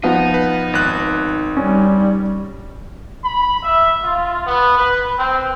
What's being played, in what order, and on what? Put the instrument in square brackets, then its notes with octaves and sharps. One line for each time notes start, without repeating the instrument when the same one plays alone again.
[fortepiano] F3 B3 F#4 [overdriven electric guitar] D#4
[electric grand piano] B4
G#1 F#6
[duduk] G3 [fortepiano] C#4
[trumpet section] B5
E5
F4
B3
B4
C4